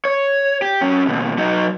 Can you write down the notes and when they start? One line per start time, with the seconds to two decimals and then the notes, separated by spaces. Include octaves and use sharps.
0.05 C#5
0.62 G4
0.81 F#2 C#4
1.07 D#2 B2
1.38 F#3 D#4